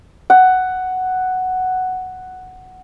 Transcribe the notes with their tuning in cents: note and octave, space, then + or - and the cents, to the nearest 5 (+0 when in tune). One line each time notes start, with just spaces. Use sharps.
F#5 +5